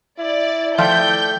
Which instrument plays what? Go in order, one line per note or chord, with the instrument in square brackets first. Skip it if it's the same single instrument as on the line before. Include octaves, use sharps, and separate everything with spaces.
[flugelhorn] E4 [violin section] D5
[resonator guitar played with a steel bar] F3 A3 E5 [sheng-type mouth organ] D5 G5 [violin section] G6